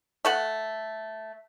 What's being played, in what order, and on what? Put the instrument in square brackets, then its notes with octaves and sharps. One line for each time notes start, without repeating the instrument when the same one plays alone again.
[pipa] A3 A4 F#5